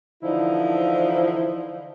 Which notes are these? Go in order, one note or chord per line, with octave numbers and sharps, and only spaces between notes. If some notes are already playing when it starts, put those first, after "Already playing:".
D3 E3 F3 D#4 E4